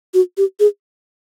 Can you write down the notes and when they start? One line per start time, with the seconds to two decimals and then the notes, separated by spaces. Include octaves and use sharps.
0.14 F#4
0.37 G4
0.60 G#4